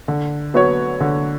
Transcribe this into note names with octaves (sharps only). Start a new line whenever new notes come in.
D3
F#3 B3 F#4 C#5
D3